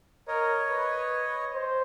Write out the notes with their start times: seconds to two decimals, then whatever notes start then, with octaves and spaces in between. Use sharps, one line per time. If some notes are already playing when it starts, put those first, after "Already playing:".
0.28 A#4 C#5 D#5
0.69 B4
1.53 C5